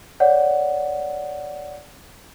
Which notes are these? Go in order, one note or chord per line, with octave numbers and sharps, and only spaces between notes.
C#5 D5 F#5